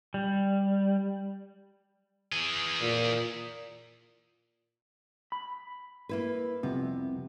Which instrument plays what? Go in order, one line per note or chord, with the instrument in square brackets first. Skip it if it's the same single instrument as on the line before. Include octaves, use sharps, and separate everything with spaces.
[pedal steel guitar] G3
[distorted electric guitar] E3 G#4
[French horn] A#2
[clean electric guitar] B5
[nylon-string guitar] A#3 E4 B4
[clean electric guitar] C2 F2 C3 [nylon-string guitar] B3